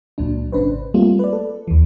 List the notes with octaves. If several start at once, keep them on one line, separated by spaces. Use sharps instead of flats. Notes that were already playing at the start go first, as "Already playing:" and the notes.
C#2 A#2 F#3 D4
G#1 C#3 D4 B4 C5
G3 A3 A#3 C4 F4
B4 D5
A4
D#2 E3